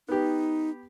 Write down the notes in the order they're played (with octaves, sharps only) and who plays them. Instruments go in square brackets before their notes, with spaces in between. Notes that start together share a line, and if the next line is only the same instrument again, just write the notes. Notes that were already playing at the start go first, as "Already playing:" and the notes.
[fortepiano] B3 G4 [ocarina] D#4